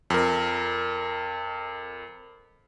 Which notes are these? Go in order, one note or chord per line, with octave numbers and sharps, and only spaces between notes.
F2 A#4